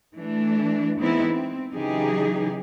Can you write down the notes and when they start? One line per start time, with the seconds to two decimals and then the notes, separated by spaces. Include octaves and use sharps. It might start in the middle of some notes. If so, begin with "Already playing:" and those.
0.15 E3 A3 D4
0.99 E3 G#3 B3 C4 D#4 E4
1.30 C4
1.72 C#3 E3 F#3 D#4 G4 G#4